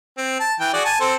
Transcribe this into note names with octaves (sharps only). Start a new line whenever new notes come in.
C4
A5
E3 G5
F#4 G#4 D5
G#5 A5
C4 A4 C5